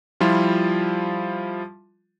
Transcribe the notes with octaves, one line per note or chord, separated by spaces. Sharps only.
F3 G3 E4 F4